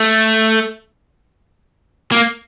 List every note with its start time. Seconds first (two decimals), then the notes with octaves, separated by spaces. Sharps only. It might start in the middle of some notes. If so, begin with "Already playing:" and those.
Already playing: A3
2.12 A#3